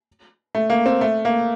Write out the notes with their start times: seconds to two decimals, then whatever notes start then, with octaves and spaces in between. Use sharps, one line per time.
0.55 A3
0.70 A#3
0.86 C4
1.01 A3
1.25 A#3